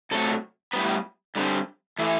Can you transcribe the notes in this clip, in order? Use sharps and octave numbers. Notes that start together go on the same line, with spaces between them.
C3 F#3 A3 A4
A2 G3 B3 B4
G2 D3 G3 C4
E3 A3